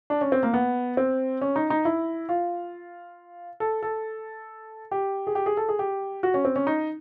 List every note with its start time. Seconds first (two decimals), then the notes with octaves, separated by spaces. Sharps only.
0.10 D4
0.21 C#4
0.32 C4
0.43 A#3
0.54 B3
0.97 C4
1.41 C#4
1.56 D#4
1.70 D#4
1.85 E4
2.29 F4
3.60 A4
3.83 A4
4.91 G4
5.27 G#4
5.35 G4
5.46 G#4
5.57 A4
5.69 G#4
5.79 G4
6.23 F#4
6.34 C#4
6.45 C4
6.56 C#4
6.67 D#4